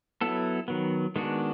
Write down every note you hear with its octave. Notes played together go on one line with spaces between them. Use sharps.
F#3 B3 E4 A4
D#3 F#3 B3
D#3 G#3 B3 D4 F#4